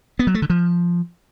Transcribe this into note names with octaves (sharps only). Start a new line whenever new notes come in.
B3
F#3
A3
D3
F3